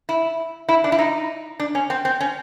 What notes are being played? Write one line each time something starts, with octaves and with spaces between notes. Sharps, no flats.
E4
E4
D4
E4
D#4
D4
C#4
C4
C4
C#4